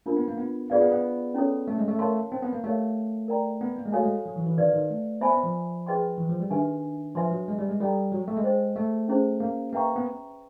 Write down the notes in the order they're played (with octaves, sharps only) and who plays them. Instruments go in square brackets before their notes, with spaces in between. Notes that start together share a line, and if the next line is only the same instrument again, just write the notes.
[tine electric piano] A#3 [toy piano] D4 F4 A#4
[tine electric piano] B3
A#3
B3
[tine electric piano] B3 [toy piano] F4 G#4 B4 D5 F5
[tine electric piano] B3
B3
[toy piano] C#4 E4 A4 C#5
[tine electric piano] A3
G#3
A3
[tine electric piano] A3 [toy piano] A#4 C#5 F5 A5 C6
[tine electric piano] C4
B3
A#3
[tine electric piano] A3 [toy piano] G4 A#4 C#5 F5
[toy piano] A#4 D5 G5 A#5
[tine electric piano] B3
A#3
G#3
[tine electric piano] A3 [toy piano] F#4 A4 C#5 F5 G#5
[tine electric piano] G#3
F#3
E3
E3
[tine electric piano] D#3 [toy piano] B4 D5 F5
[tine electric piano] D#3
A3
[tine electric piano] B3 [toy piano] C5 E5 G#5 B5
[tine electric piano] B3
F3
[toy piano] G#4 B4 D#5 G5 C6
[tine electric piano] E3
F3
G3
[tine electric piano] D#3 [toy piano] D4 G4 B4 E5 G#5
[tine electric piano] F3 [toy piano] B4 E5 G#5 C6
[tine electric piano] F#3
G#3
G3
G#3
[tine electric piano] G3 [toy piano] A4 D5 G5 A#5
[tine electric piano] F#3
A3
G#3
[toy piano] G#4 C5 D#5 G5
[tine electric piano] A3
[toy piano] C#4 E4 G#4 C5
[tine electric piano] A#3
[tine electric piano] A#3 [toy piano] B4 E5 G5 A#5 C#6
[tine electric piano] B3